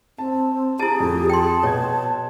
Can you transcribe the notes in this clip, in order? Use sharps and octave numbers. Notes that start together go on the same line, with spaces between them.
C4 A5
E4 G4 G#4 A5 A6 D7
F2 G4
G5 A5 C6
B2 C#5 C6 G#6